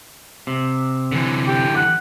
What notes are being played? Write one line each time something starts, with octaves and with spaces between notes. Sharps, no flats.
C3
D3 E3
G4
F#5